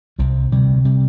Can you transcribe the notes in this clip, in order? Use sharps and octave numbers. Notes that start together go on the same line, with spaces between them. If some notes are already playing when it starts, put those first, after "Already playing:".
C2 C3 G3
D2 C3 G3
C3 G3